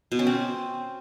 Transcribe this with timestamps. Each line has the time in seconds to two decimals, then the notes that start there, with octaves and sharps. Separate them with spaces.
0.12 B2
0.19 C#4
0.27 C4